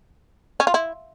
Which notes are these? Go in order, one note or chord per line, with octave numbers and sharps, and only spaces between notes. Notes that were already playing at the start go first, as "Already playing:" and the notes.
C#4
F4
E4